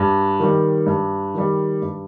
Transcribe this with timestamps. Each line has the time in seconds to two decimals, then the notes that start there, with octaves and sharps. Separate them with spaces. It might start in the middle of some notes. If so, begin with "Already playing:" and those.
Already playing: G2
0.40 D#3 G3
0.86 G2
1.34 D#3 G3
1.82 G2